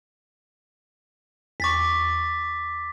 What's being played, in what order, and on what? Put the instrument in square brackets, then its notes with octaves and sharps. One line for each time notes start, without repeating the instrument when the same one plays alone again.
[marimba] E2 C#6 [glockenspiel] D6 A6 B6